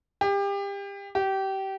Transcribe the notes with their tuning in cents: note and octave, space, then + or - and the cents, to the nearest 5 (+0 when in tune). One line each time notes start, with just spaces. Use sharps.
G4 +30
G4 -25